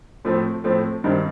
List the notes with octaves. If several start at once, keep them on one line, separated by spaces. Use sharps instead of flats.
A2 F3 A3 C4
A2 F3 A3 C4
G2 D#3 G3 C4